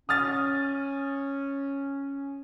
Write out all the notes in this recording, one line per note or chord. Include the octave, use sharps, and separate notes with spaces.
C#4 D#6 F6 A6